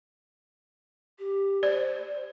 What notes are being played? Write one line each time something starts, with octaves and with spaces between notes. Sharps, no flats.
G4
C5 D5